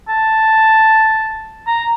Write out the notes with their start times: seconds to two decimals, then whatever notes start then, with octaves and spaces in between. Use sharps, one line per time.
0.08 A5
1.67 A#5